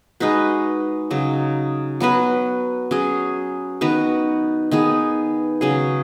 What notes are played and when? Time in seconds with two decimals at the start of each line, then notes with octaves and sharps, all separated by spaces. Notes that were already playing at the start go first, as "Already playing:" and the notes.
0.20 G#3 D#4 F#4 B4
1.11 C#3 F#3 D#4
2.00 F#3 B3 F#4 B4
2.91 F#3 C#4 G#4
3.81 D#3 B3 F#4 B4
4.71 D#3 B3 G#4
5.61 C#3 F#3 C#4 G#4